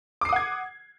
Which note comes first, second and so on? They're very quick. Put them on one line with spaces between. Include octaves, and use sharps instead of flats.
D6 C7 D#6 F#5 G#6